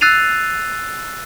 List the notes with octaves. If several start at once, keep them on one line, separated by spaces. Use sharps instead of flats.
E6 F#6 A6 C7 D#7 F7